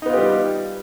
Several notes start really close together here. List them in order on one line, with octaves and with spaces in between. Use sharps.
D#4 B3 F4 G4 G3